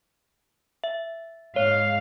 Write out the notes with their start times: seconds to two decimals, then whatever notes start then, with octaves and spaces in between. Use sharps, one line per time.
0.84 E5
1.56 G#2 C#5 F5